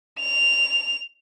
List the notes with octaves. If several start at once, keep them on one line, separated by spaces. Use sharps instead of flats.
F7